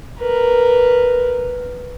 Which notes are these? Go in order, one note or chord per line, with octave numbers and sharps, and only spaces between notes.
A#4 B4